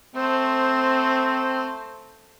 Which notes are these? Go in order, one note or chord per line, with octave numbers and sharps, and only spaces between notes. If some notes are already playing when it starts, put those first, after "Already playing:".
A3 C4 C5